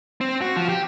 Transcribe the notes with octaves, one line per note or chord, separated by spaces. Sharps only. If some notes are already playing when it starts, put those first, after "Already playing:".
C4
F#4
F3
G4